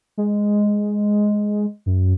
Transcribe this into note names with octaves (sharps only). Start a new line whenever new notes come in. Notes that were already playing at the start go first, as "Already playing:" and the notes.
G#3
F#2